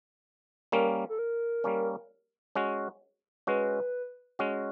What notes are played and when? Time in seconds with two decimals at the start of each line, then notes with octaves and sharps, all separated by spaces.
0.72 G3 A#3 C#4 A#4
1.09 A4
1.19 A#4
1.64 G3 A#3 C#4
2.56 G#3 C#4 F#4
3.47 G#3 C#4 F#4 B4
4.39 G#3 C#4 F#4